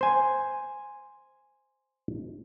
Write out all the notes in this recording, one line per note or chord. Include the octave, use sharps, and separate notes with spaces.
C5 G#5